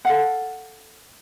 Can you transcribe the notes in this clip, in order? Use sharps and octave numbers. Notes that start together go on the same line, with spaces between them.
A4 F5 F#5